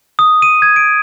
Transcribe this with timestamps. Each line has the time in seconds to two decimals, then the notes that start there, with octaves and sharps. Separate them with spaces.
0.19 D#6
0.42 D#7
0.62 G#6
0.76 D7